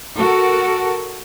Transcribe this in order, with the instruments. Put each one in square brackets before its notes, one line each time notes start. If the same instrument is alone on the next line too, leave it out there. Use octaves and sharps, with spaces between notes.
[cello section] F#4 A4 A#4